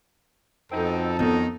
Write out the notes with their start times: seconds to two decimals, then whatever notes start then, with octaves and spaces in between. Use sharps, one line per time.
0.72 F2 B2 C4 D#4 A4
1.19 D#3 F#3 B3 D#4